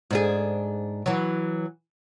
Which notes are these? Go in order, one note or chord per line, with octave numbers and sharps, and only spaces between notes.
G#2 D4 G#4
E3 F#3